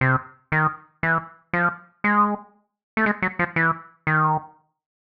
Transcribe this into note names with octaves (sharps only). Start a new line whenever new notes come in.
C3
D#3
E3
F3
G#3
A3
G#3
F#3
F3
E3
D#3